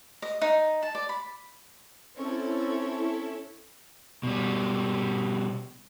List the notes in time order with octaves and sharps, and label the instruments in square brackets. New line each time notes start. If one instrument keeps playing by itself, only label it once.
[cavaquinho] D#5
D#4
A5
D5
B5
[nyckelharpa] C4 [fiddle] C#4 C#5 [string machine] E4 A4
[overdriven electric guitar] B2 G3